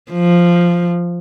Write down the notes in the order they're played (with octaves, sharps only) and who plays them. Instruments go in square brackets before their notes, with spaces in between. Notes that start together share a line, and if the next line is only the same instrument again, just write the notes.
[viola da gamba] F3